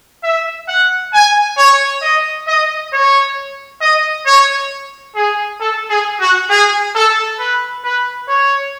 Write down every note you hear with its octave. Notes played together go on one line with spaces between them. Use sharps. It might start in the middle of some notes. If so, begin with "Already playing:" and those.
E5
F#5
G#5
C#5
D#5
D#5
C#5
D#5
C#5
G#4
A4
G#4
F#4
G#4
A4
B4
B4
C#5